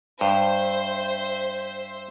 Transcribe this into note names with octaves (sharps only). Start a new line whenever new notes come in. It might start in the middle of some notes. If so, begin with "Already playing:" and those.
G2 C5 E5